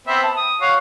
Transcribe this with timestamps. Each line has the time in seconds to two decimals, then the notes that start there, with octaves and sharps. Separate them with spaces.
0.07 B3 C4 E5
0.23 A5
0.37 D#6
0.61 F#4 C#5 F5